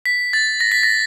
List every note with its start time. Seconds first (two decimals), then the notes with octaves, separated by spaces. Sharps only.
0.06 B6
0.33 A6
0.60 A#6
0.72 B6
0.83 A#6